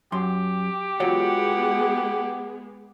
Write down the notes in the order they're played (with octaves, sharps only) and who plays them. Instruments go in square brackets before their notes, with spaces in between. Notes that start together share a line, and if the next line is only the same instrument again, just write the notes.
[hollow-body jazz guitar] F#2 C6 [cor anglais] G4
[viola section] G#3 B3 G#4 [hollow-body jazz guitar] F4 F#4 C#5 [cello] F#5